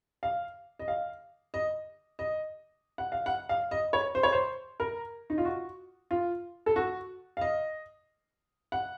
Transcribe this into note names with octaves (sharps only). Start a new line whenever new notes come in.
F5
D#5
F5
D#5
D#5
F#5
F5
F#5
F5
D#5
C#5
C5
C#5
C5
A#4
D#4
F4
F#4
F4
A4
F#4
F5
D#5
F#5